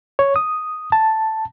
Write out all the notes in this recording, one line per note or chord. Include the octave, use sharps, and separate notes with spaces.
C#5
D#6
A5